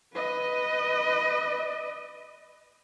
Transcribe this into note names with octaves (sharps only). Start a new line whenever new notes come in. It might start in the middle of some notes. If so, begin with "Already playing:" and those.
B4 D#5